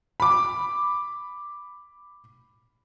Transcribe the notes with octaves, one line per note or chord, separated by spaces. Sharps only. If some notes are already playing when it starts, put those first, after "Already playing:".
B5 D6